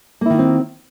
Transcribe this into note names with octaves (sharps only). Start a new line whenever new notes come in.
D#3 A#3 C4 E4 F4